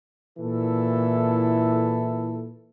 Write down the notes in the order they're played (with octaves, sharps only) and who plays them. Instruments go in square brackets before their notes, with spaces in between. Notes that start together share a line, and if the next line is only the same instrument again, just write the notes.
[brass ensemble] A#2 E3 E4 A4